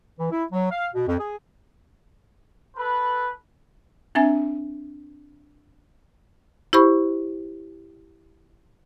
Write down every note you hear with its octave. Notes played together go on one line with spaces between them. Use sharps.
E3
E4
F#3
F5
B2
F2
G#4
A4 B4
C4 D4 E5 G#5
E4 G4 C5 B5 C#6